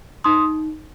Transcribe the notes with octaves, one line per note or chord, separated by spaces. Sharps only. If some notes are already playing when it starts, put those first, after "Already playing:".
D#4 C6 D#6